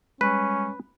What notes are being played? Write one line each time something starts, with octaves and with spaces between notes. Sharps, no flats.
G3 G#3 C#4 B4